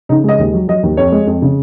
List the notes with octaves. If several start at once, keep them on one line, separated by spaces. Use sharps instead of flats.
C#3 D#4
G#3 D#5
D#2
F#3
F#3 D#5
D#2
F2 C#5
G#3
F2
C#3